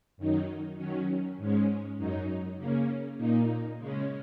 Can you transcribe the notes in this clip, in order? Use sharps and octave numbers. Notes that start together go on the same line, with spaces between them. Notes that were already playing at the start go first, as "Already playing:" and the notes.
F#2 D#3 F#3 D#4
D#3 F#3 C#4
G#2 G#3 C#4
F#2 F#3 D#4
C#3 A#3 C#4
A#2 A#3 D#4
C#3 G#3 C#4